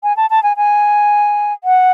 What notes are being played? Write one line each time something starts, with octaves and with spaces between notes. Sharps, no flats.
G#5
A5
A5
G#5
G#5
F#5